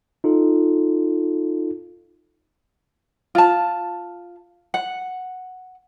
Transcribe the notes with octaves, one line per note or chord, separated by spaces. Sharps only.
D#4 F4 A4
F4 A5
F#5